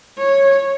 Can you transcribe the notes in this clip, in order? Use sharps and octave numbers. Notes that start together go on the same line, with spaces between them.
C#5